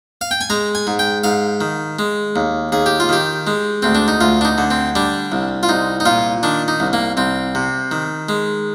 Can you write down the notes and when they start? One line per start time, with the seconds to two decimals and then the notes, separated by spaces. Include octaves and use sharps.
0.21 F5
0.31 G5
0.41 G#5
0.50 G#3 A#5
0.75 G#5
0.87 G#2
0.99 G5
1.24 G#2 F5
1.61 D#3
1.99 G#3
2.36 D#2
2.72 D#2 G#4
2.86 G4
3.00 F4
3.09 D#3 G4
3.47 G#3
3.82 D2 C4
3.95 D4
4.08 D#4
4.21 D2 F4
4.41 D4
4.45 D#4
4.58 D3
4.71 C4
4.96 G3 D4
5.32 C2
5.63 F4
5.69 C2 D#4
6.00 D#4
6.06 A#2 F4
6.43 D#3 D4
6.68 D#4
6.80 C2
6.93 A#3
7.17 C2 C4
7.55 C3
7.92 D#3
8.29 G#3